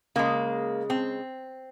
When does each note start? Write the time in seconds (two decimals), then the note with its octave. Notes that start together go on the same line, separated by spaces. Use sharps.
0.16 C#3 G#3 A#3
0.90 C4